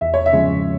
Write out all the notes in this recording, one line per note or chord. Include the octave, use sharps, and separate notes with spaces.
E2 E5
C#5
E5
C#3 F3 G#3